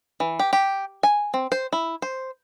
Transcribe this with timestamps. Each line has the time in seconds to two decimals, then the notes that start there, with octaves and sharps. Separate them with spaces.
0.20 E3
0.39 G4
0.53 G4
1.03 G#5
1.34 C4
1.52 C5
1.72 E4
2.02 C5